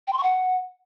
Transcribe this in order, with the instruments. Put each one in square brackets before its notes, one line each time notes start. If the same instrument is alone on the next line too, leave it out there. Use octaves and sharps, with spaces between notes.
[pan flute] G5
C6
C#6
F#5